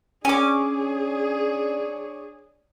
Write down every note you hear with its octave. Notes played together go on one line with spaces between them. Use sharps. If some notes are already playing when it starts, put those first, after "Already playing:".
C#4 D4 G#4 C#5 D5 G#5 D6